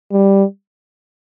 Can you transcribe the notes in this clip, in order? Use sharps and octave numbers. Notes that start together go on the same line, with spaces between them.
G3